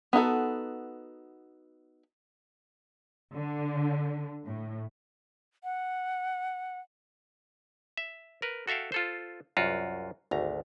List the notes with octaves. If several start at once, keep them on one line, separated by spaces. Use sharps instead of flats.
B3 D#4 F#4 A4
D3
A2
F#5
E5
A#4 B4
F#4 A4 E5 F5 G5
F4 A4 C5
C2 F#2 F4 F#4
G#1 D2 A#5